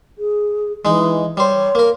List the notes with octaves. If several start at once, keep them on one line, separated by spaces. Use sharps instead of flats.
G#4
E3 G#3 D#4
G3 C5 C#5
A#3 A#4